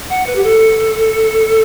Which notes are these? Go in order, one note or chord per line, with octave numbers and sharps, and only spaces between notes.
F#5
B4
G4
A4